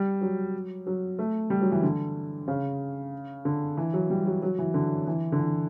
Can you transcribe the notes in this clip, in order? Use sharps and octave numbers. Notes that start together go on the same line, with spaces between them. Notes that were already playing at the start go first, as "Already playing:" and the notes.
Already playing: G3
F#3
F#3
A3
G3
F#3
E3
D3
C#3
D3
E3
F#3
G3
F#3
F#3
E3
D3
E3
D3
E3